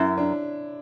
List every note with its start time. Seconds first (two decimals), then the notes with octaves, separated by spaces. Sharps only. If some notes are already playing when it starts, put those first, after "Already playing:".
Already playing: F#2 E4
0.18 D4